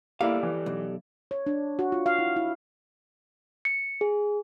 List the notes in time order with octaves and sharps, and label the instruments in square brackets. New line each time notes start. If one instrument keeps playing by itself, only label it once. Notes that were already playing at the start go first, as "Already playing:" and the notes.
[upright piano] A#3 E4 [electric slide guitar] G4 A4 D5 [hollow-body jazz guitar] F5
[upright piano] E3
[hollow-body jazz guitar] B1
[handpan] C#5
D4
F#4
F4
F5
E4
E4
[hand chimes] C#7
G#4